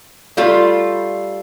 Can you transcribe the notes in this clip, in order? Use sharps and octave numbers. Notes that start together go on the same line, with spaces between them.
G3 A3 F4